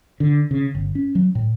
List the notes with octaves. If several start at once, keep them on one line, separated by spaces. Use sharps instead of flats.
D3
C#3
G1
C#4
F#3
A2